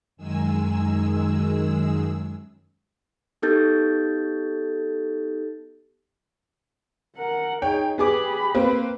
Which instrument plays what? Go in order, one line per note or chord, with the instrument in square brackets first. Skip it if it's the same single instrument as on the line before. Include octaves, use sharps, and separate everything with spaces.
[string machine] F#2 D#3 G#3 G#4 E6
[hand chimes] B3 D#4 G4 A4 G6 A6
[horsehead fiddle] A#4 F#5
[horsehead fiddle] D#4 G#4 [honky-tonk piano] C#5 G5
[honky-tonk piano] B3 G#4 D6 [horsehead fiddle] G4 B5
[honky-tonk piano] A#3 C4 B4